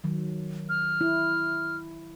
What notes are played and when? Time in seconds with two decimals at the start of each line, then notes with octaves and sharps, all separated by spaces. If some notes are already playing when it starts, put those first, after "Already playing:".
0.04 D#3 F#3
0.69 F6
1.01 E4